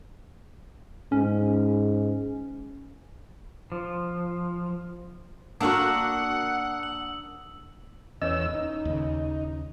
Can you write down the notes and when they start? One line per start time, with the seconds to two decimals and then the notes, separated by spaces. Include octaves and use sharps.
1.12 G#2 C#4
3.72 F3
5.61 A#3 D4 F#4 A#4 F#5 D#6 E6 F#7
6.83 F#7
8.22 E2 C#4 C#5 D#5 E6
8.54 D#4
8.85 D#2 C#3